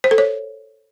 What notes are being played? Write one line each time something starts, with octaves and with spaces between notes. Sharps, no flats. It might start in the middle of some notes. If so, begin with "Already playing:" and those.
C5
A4
C#5